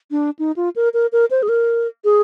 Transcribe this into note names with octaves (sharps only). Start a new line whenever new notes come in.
D4
D#4
F4
A#4
A#4
A#4
C5
G#4
A#4
G#4